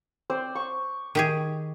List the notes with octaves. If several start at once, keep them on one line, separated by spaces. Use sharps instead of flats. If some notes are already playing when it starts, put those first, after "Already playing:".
C4 C5 D5
C#6
D#3 G4 G#4